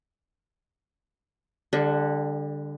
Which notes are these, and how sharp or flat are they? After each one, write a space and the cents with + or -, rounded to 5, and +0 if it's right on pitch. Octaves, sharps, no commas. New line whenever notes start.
D3 +0 G3 +35